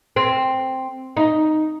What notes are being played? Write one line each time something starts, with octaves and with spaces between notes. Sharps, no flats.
C4
D#4